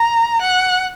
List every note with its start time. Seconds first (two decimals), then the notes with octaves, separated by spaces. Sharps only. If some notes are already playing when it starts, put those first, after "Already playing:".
Already playing: A#5
0.41 F#5